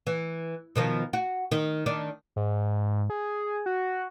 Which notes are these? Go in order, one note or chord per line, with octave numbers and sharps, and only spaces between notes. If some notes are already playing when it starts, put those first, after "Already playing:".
E3
B2 D#3 F3
F#4
D#3
D#3 D4
G#2
G#4
F#4